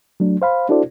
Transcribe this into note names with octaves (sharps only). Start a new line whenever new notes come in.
F#3 A3 D4
C5 F5 B5
D4 E4 F#4 A4 C5 D5